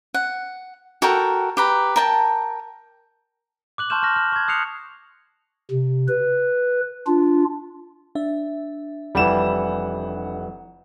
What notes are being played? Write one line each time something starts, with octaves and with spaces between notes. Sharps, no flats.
F#5
F#4 A4 A#4 G5
G4 B4 A#5
A#4 G5 A5
D6 F#6 F#7
A5 C6 C#6 F6 G6 E7
A5 C#6 F6 A#6
F6
C#6 G#6
D#6 F#6 C7 C#7 F7
C3
B4
D4 F4
D4 E5
F1 E3 G3 F#5 E7